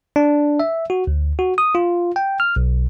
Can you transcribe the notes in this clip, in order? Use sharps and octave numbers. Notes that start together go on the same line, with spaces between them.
D4
E5
F#4
D2
F#4
D#6
F4
G5
F6
B1